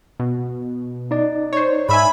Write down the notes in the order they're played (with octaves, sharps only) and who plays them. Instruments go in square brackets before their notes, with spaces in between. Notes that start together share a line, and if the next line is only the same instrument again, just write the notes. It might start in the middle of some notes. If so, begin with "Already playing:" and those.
[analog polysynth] B2
[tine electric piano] D#4 D5
[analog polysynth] C5 C#5
[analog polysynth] G#2 E5 G#5 [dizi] B5